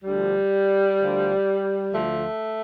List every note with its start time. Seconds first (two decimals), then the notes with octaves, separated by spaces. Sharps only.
0.04 D2 D3 F3 G3
0.99 D2 D3 F3
1.92 D2 D3 F3 A3